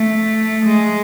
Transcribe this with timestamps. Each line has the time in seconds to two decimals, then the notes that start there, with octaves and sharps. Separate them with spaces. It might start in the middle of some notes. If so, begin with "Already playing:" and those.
Already playing: A3
0.66 G#3